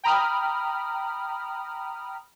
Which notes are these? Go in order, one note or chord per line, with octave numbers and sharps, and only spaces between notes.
G5 A#5 B5 D#6 F6